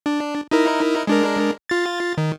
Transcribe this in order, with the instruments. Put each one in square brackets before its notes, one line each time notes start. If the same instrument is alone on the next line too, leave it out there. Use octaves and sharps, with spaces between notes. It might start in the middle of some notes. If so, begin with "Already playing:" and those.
[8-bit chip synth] D4
D#4 E4 A#4
G#3 D4 A#4
F4 A6
D#3